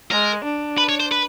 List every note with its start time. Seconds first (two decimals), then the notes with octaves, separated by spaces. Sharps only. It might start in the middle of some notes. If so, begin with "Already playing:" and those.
0.11 G#3 A#4
0.44 D4
0.78 B4
0.89 C#5
1.00 C5
1.11 B4